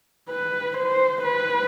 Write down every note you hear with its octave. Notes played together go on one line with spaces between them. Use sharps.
B4
C5
B4